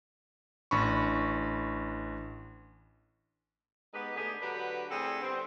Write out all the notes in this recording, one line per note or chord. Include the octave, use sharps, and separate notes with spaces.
A1 D4 B5 C#6
G#3 B3 D#4 G4 B4
D3 A3 B3 G4 G#4
D3 F#3 G4 B4
A2 C4 D4 E4 G#4 A4
D3 G3 B3 C4